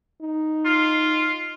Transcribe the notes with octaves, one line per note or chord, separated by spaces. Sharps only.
D#4
F4